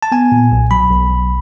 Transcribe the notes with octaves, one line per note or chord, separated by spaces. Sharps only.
A5
B3 G#5
A#2
B1
F#3 B5
B1
B1